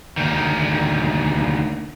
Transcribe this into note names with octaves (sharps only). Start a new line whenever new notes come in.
D2 D#3